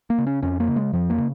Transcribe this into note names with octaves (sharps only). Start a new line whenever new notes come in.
A#3
C#3
C#4
F2 C#4
A#3
C#3
G#3
F2 F3
A#3
C#3